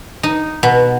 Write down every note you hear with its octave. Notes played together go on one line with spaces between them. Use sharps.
D#4
B2